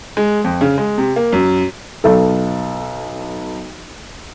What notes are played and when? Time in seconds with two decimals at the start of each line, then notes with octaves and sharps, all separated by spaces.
0.17 G#3
0.44 F2
0.61 C#3
0.78 G#3
0.98 C3
1.16 A#3
1.33 F#2
2.04 B1 A4